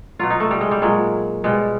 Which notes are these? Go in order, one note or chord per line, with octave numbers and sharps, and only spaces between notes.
B2 F#3 F4
D#4
A3
G3
G#3
G3
A#2 F#3 G#3
B2 G3 G#3